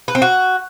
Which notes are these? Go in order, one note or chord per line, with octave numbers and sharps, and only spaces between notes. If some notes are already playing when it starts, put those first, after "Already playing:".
B4
C4
F#4